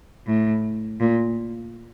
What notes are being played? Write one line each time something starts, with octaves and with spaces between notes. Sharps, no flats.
A2
A#2